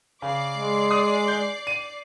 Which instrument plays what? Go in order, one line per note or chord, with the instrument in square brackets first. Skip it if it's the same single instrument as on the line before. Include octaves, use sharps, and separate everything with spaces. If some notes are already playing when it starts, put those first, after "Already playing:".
[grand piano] C#3 [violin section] D5 D6 C7
[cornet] G#3
[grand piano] D#6
G6
D#7